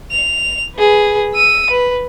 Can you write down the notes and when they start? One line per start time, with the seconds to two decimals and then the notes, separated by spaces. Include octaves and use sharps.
0.11 F7
0.76 G#4 B4
1.35 E6 D#7
1.70 B4